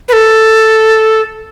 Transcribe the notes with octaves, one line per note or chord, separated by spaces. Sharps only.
B4
A4